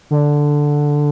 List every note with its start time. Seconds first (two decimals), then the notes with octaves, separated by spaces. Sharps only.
0.11 D3